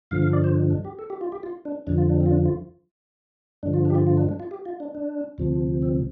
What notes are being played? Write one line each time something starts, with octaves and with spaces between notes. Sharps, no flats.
G2 D3 F3 F5
F5
D5
C5
D4
D4
G4
A4
G4
F4
G4
F4
D4
F2 D3 F3 D4
F4
D4
C4
F4
D4
F4
G2 D3 F3 D4
F4
D4
G4
F4
F4
D4
D4
F4
G4
F4
D4
D4
D2 C3 F3
C4